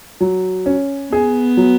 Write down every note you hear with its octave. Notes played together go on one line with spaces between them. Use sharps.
F#3
C#4
B3 G#4
F#3